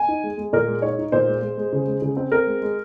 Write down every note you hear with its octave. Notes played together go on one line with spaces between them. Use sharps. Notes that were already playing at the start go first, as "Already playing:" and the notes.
Already playing: G#5
D#4
G#3
G#3
A#2 A#4
G#3
D#4 C#5
D#4
A#2 C5
G#3
G#3
G#3
C#3
G#3
C#3
C4
C4 A#4
G#3
G#3